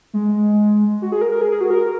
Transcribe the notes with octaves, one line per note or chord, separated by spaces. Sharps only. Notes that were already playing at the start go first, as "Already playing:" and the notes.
G#3
F#4
G#4
A#4
A#4
G#4
G#4
F#4
A#4